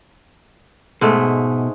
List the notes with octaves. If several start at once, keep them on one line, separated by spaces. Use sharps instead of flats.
G#2 B2 G#3 A3